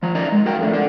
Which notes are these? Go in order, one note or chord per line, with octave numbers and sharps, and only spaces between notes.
F3 A#5
D#4 A#4 D5 D#5 A#5
G#3
F#4 A#4 G5
F2 A3 D4
D4 A4 D5